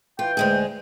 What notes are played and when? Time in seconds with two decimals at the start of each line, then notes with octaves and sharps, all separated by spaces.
0.19 E3 F4 G5
0.37 D2 G#3 G#4